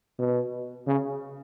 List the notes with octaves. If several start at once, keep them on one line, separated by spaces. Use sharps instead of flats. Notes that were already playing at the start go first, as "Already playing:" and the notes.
B2
C#3